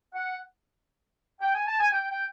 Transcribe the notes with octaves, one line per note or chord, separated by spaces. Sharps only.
F#5
G5
G#5
A5
G#5
G5
G5